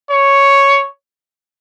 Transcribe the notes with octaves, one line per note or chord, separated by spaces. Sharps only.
C#5